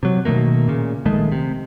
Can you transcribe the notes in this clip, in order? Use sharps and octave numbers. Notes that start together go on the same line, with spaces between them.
C3 F#3
B2 D#3 A3 A#3
A#2 C#3
A#1 D#3 G#3 A3
C3